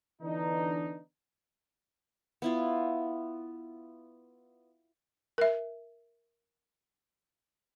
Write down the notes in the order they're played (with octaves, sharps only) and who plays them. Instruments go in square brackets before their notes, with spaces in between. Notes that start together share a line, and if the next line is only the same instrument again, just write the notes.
[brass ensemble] D3 E3 B3 D4 D#4
[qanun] B3 E4 F4
[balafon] A#4 E5